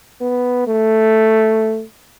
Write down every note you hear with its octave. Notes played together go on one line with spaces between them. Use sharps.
B3
A3